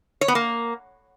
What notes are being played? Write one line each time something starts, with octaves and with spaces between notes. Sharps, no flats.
C#5
B3
A#3